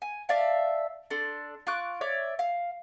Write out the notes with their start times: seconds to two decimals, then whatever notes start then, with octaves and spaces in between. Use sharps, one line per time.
0.02 G#5
0.29 D5 E5 F5 A5
1.10 D4 A4 C6
1.67 F4 C#6 D6 F#6
2.01 C#5 D5 E5 D6
2.39 F5